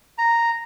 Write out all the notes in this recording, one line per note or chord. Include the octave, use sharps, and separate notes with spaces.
A#5